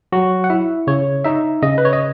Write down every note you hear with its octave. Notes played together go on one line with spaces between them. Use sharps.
F#3 F#4
F#5
E4 E5
C#3 C#5
D#4 E5
C#3 D#5
B4
C#5
D#5